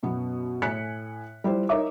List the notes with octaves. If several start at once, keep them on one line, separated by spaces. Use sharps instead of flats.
F#2 B2 B3
A2 G#5 F#6 B6 C#7
G3 E4 F4 C5
D#4 A#4 C#5 D#5 E5 D6